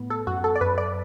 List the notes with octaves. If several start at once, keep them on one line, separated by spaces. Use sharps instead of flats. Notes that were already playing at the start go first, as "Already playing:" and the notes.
Already playing: A2 B3
A4
F#2 F#4
A4
D5
F#2 B4
D5